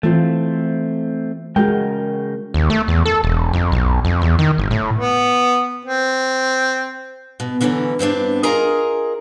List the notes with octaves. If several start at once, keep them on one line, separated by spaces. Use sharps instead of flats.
E3 A3 C4 F4
C#3 G#3 F#4 A#4 G5
D#2
A3
E2
A4
E1
F2
B1
F2
E2
D#3
G1
A2
B3
C4
B2
D3 E3 F#3 A3 C#4
G2 B3 C4 D4
F4 G#4 A#4 D#5 G#5 A#5